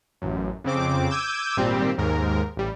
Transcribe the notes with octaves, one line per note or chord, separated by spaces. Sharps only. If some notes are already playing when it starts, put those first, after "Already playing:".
A1 F#2
F2 C#3 C4 D6
D6 E6 G6 G#6 D#7
G#1 A#2 G3 C4 G4
D#2 G#2 A#4
A1 G3